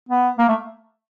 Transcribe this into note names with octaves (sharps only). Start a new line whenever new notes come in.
B3
A#3
A3